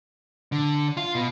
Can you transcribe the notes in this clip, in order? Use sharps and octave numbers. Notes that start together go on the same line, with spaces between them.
D3
F4
B2